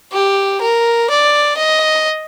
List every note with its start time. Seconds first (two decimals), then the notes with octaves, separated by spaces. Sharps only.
0.13 G4
0.61 A#4
1.10 D5
1.57 D#5